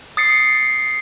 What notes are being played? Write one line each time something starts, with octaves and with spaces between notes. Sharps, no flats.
D#6 A6 C7 C#7